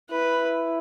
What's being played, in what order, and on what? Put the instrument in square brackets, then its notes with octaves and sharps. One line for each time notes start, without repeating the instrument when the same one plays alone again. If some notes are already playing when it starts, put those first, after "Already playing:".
[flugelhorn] E4 [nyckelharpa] B4